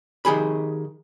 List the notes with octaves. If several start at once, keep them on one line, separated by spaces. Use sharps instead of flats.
D#3 G4 G#4 B5